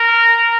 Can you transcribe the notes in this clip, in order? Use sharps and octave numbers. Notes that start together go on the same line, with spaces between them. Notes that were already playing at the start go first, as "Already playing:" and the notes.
Already playing: A#4